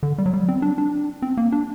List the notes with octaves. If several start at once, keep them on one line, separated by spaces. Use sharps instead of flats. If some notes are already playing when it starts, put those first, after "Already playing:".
D3
G3
F#3
G3
C4
D4
D4
C4
A#3
D4